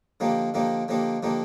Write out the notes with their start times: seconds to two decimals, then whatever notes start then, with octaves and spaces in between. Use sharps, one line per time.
0.20 D3 F3 A#3 D#4 G4
0.54 D3 F3 A#3 D#4 G4
0.88 D3 F3 A#3 D#4 G4
1.23 D3 F3 A#3 D#4 G4